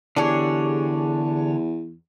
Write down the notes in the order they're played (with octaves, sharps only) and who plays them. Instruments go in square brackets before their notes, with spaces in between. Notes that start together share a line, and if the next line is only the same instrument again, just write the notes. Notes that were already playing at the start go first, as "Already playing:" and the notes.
[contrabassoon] E2 [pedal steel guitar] D3 C#5 [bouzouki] D4 G4 G#4